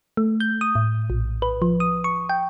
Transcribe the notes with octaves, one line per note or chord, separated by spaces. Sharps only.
A3
G6
D#6
A2
A#1
B4
F3
D#6
C#6
G5